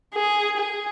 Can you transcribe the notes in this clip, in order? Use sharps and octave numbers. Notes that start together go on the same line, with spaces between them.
G#4
G#4